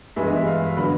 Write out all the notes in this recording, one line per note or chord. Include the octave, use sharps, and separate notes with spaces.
G2 E3 G#3 B3 E5
D#5
E5
F5
D3 F#3 B3 B5